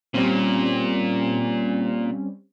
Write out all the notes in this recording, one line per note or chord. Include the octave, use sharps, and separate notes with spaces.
A#2 G3 C4 C#4